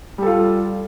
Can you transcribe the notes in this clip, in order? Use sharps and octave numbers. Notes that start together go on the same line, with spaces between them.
G3 F4 A4